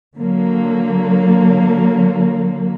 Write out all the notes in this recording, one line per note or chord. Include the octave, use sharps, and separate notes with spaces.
D3 F#3 A#3